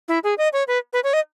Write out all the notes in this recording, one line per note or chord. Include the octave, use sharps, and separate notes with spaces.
E4
G#4
D#5
C#5
B4
B4
C#5
D#5